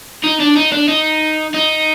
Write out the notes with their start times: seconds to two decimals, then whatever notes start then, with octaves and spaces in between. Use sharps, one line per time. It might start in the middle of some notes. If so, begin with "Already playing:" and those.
0.24 D#4
0.40 D4
0.56 D#4
0.72 D4
0.88 D#4
1.54 D#4